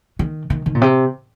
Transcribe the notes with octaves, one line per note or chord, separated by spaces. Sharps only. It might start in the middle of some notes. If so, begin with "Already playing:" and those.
D#3
D#3
D#3
A#2
C3